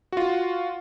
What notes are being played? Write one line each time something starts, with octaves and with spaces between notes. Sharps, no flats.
F4 F#4